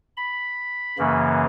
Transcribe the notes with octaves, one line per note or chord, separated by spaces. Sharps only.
B5
F#2 C#3 E3 A#3